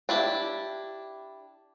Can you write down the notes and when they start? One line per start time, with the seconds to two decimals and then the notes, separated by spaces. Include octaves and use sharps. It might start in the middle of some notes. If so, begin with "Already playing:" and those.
0.09 D4 E4 G4